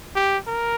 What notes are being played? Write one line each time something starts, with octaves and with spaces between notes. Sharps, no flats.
G4
A#4